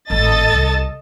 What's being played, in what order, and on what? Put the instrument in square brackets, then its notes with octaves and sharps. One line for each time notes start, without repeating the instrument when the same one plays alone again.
[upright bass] G#1 A2 [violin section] A4 D#5 A6
[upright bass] C2